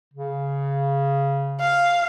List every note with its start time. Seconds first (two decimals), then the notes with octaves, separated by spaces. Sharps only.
0.14 C#3
1.60 F5